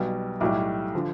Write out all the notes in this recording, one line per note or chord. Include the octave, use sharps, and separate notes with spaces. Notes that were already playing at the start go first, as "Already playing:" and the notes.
Already playing: B1 B2 G3
B1 A2 G3 D6
D3 F3